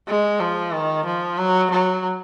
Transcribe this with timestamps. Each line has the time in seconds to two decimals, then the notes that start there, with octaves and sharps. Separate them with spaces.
0.08 G#3
0.40 F3
0.74 D#3
1.05 F3
1.38 F#3
1.71 F#3